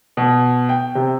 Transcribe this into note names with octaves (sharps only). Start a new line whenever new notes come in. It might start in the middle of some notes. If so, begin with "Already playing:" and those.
B2
G5
C3